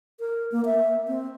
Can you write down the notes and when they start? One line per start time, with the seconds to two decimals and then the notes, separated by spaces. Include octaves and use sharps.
0.20 A#4
0.52 A#3
0.65 E5
1.08 C4